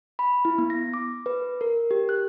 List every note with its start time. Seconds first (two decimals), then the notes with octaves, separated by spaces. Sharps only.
0.19 B5
0.45 E4
0.58 B3
0.70 A#6
0.94 D6
1.26 B4
1.61 A#4
1.91 G4
2.09 F#6